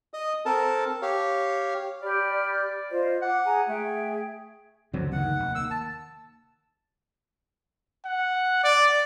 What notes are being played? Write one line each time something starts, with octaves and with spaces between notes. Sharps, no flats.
D#5 D#6
C4 A4 A#4 A5
G4 C#5 F5
G4 D5 B5 F6
D5
F4 C5 D#5
F#5 D6
G#4 G#5 A#5
A3 G#4 E5 G5
F#1 D2 G2 D3 F#3 C4
D#2 D#3 F#5
F1
A#3 E6
A5
F#5
D5